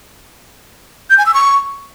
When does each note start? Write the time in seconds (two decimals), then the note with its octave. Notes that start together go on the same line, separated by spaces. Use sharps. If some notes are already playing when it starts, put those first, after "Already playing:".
1.10 G6
1.18 G#5
1.26 E6
1.34 C#6